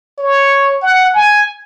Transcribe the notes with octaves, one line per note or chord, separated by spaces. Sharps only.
C#5
F#5
G#5